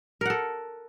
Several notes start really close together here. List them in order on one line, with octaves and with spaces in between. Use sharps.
A#4 F#5 A4